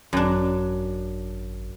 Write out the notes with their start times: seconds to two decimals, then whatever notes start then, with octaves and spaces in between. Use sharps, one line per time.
0.13 G#1 F#2 D4